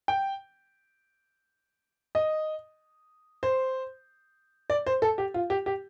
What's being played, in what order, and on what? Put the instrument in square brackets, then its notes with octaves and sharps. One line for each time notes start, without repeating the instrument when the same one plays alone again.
[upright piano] G5
D#5
C5
D5
C5
A4
G4
F4
G4
G4